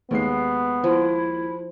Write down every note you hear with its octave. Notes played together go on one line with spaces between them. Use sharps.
D#2 G#3 B3 C7
F3 E4